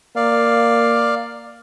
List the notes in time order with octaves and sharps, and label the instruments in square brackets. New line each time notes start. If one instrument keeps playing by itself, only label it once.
[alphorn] A#3 [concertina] D5 F5